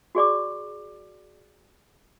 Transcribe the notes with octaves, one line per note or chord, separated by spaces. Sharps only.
F#4 G#4 D5 D6